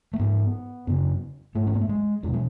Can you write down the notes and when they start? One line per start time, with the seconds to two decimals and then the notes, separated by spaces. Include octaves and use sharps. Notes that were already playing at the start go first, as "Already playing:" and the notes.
0.13 A3
0.19 G#2 B3
0.87 F#2 C#3
1.55 G#2 A3
1.67 C#4
1.74 B3
1.81 A3
1.89 G#3
2.23 E2 B2 F#3
2.33 G#3